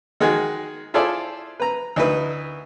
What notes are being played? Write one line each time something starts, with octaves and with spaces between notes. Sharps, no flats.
D#3 G#3 F#4 G#4
E4 F4 G#4 A4 C5 D5
B4 A#5
D2 D#4 E4 B4